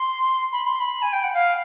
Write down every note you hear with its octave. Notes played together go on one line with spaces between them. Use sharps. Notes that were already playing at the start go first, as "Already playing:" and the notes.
Already playing: C6
B5
C6
B5
G#5
G5
F#5
F5